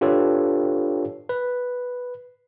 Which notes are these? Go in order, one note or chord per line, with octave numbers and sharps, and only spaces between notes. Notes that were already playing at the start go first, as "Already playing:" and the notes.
D4 F4 G4 A4 B4 C#5
B4